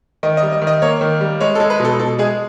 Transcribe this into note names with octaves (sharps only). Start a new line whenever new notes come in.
D#3 D#5
D#5
G3
D#5
D#3
D#5
A#3 C#5
D#3
G3
G#3 C#5
A4
G#3
B4
B2 A4
B2 A4
G#3 G#4